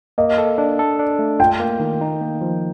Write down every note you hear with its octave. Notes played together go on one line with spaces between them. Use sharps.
A#3 D#5
A4
D4
A4
D4
A3
F4 G5
A#3
D#3
D#4
A#3
F3